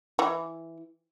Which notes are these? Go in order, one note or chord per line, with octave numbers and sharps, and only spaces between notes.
E3